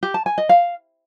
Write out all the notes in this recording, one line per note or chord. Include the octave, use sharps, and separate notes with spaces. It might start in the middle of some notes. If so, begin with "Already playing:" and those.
G4
A5
G#5
D#5
F5